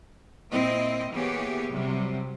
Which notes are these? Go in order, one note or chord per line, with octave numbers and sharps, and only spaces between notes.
A#2 C4 E4 D#5
E3 A#3 B3 G4 G#4 C#5
C3 F#3 G3